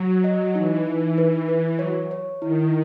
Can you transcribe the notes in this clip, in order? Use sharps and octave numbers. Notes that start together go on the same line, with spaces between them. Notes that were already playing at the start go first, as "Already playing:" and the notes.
Already playing: F#3
D#5
E3 D#4
D#4
B4
B4
F#3 C#5
C#5
D#3 E4